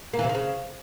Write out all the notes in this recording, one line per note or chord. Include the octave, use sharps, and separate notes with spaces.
A#3
E3
C3
D#3
C#3